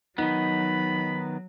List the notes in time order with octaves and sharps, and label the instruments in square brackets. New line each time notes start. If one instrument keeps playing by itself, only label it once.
[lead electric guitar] D#3 B3 [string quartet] F#3 [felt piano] D#4 [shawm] B5